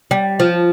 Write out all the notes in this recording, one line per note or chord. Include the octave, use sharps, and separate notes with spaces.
G3
F3